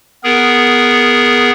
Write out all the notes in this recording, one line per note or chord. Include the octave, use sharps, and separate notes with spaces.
B3 G#4 A#4